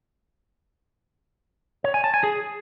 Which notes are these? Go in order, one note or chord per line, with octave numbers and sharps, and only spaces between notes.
C#5
G#5
A5
G#5
G#4